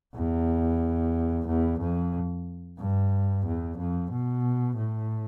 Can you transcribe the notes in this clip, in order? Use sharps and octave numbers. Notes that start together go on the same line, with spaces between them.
E2
E2
F2
G2
E2
F2
B2
A2